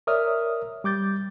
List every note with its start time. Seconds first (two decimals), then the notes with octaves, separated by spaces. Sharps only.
0.07 A#4 C#5 D5 E5 D#6 F6
0.84 G3 D6 G6 A6